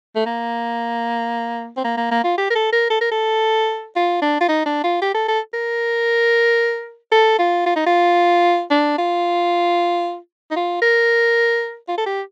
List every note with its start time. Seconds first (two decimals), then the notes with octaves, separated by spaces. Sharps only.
0.16 A3
0.26 A#3
1.77 C4
1.84 A#3
1.97 A#3
2.11 A#3
2.24 F4
2.38 G4
2.50 A#4
2.55 A4
2.72 A#4
2.90 A4
3.01 A#4
3.11 A4
3.96 F4
4.21 D4
4.41 F4
4.48 D#4
4.66 D4
4.84 F4
5.02 G4
5.14 A4
5.28 A4
5.53 A#4
7.12 A4
7.39 F4
7.66 F4
7.76 D#4
7.86 F4
8.71 D4
8.98 F4
10.51 D#4
10.56 F4
10.82 A#4
11.88 F4
11.98 A4
12.06 G4